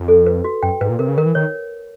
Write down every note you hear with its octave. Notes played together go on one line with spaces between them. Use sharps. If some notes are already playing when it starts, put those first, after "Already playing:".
Already playing: F2
A4
B4
F#4
F#2 G5
G#2 B4
A#2
C3 A#4
C#3
D#3 A#4
E3
D#3 C#5